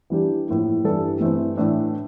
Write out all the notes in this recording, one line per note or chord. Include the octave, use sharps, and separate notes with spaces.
E3 G3 D4 G4
A2 F3 A#3 E4
G2 E3 G3 D4 A4
G2 E3 A3 C4 E4
A2 E3 A3 D4